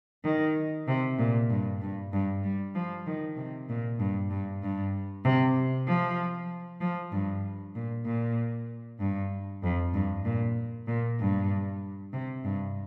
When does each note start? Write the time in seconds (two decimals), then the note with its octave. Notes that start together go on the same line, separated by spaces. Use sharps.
0.24 D#3
0.88 C3
1.19 A#2
1.50 G2
1.82 G2
2.13 G2
2.44 G3
2.75 F3
3.07 D#3
3.37 C3
3.69 A#2
3.99 G2
4.31 G2
4.63 G2
5.25 C3
5.87 F3
6.81 F3
7.12 G2
7.75 A#2
8.06 A#2
9.00 G2
9.63 F2
9.94 G2
10.25 A#2
10.87 A#2
11.19 G2
12.13 C3
12.44 G2